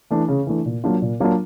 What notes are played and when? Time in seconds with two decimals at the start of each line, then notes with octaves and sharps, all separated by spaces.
0.10 E3 A3 D4
0.28 C#3
0.47 E3 A3 D4
0.65 A#2
0.84 F#3 A#3 D4 F4
1.02 A#2
1.20 F#3 A#3 D4 F4